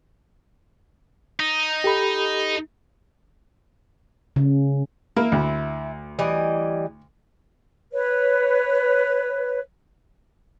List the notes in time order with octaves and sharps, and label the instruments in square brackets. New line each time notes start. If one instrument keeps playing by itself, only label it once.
[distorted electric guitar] D#4
[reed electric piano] G4 A4 B5
[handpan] C#3
[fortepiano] A#3 [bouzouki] E4
[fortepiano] D2
[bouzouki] E3 G3 D#5
[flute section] B4 C#5